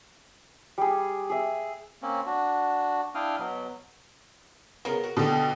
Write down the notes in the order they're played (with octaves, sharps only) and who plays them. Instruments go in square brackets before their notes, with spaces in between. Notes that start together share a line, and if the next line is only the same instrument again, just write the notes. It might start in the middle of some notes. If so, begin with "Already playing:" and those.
[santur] G3 G#4
G#4 E5
[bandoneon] A#3 C4 C#4
D4 F#4
D4 E4 F5 G5 D#6 F6
B2 F#3
[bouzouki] C#3 B3 [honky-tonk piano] A#4
[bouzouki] F#4
[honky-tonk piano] B2 D3 [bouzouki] G4 A4